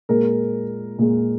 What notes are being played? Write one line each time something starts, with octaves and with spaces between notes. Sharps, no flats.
A#2 G#3 A#4
A#2 G#3